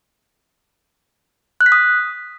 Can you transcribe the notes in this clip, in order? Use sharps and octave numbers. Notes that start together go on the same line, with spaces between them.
F#6
B6
D#6